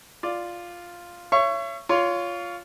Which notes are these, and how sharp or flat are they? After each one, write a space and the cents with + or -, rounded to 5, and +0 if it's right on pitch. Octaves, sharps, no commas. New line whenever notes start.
F4 +0 D5 +0
C#5 +0 E5 +40 C#6 +0
F4 +0 C#5 +25 C6 +0